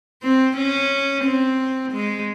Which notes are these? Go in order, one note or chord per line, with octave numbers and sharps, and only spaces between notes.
C4
C#4
C4
G#3